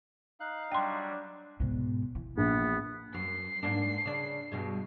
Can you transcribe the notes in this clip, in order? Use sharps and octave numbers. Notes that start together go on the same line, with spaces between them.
D#4 F5 F#6
F#3 G3 D4 G5 C6
G#2 B2
E3
A#1 B3
F#2 C7
G#2 A#3 D4
C#3 D4
G2 B2 G#3